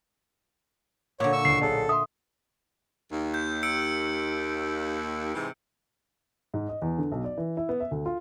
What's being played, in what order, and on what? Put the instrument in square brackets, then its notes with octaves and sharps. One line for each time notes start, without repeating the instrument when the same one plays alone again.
[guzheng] A#2 D3 [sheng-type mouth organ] C#5
[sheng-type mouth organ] C#6 E6
[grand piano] C#2 E3 [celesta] C7
[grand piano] B1 D4 G#4 [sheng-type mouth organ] A4
[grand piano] E5 C6 [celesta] D#6
[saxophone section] D#2
[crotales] G6
E6 C#7 D7
[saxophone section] G#2 C3 E3
[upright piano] G#2
D#5
E2
D3
B1
D5
E3
E4
B3
E5
D2
F4